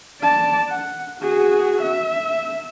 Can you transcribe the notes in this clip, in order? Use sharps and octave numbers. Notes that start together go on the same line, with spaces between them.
D5 A5
F#5
F#4 G#4
E5